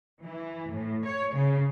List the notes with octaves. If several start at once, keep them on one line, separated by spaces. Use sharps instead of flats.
E3
A2
C#5
C#3